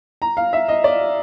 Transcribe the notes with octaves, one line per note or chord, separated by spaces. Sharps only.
A#5
F5
E5
D#5
D5